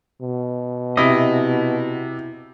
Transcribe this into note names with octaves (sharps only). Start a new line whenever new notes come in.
B2
C3 E4 D#5